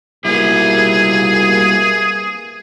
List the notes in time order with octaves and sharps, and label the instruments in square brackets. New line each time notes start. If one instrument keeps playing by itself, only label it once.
[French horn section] G#2 B2 A#3 [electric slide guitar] G3 E4 [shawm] G#4